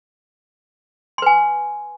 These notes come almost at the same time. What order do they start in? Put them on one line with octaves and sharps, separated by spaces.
C6 B4 G#5